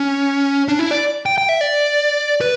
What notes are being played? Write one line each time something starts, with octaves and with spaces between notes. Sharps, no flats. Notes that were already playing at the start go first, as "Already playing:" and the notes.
Already playing: C#4
D4
E4
D5
G5
G5
E5
D5
B4